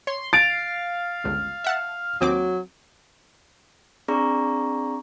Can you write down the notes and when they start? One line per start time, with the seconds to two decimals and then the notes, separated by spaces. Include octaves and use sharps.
0.07 C#5 C6
0.33 F5 A6 D7
1.24 G1 C#2
1.64 E5 F#5 A5
2.21 D#2 F#3 C4 D6
4.08 C4 D4 G#4 D5 A#5 C#6